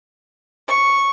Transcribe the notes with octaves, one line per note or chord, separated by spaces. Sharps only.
C#6